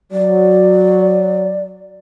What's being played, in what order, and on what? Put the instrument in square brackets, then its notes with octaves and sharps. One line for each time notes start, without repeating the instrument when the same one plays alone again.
[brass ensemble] F#3 [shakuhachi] D5